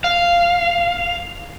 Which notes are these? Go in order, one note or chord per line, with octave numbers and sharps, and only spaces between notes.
F5